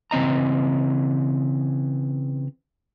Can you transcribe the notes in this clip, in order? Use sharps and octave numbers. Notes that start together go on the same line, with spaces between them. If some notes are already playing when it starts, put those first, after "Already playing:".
C#3 E3 C4 D#5 A#5